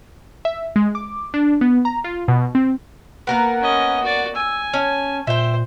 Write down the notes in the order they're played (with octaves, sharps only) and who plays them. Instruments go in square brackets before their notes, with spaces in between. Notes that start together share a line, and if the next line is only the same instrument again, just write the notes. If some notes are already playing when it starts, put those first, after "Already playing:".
[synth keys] E5
G#3
D6
D4
B3
A#5
F4
B2
C4
[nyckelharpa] A#3 [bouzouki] B3 A#4 B4 [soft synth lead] F#5
[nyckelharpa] C#4 D#5
F#4 D5
[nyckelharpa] G#5 [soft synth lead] E6
[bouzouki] C#4 [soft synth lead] A5
[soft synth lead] A#2 [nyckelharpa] C5 [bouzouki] E5 G5